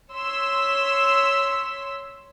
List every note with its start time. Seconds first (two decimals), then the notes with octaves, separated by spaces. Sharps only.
0.13 C#5 C6 E6 B6